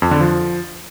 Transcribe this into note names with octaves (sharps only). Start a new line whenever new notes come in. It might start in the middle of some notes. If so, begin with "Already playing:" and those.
F2
D3
F3